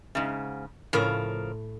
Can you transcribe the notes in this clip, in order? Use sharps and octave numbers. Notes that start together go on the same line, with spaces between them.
G#2 C#3
A2 C#3 F3 A#4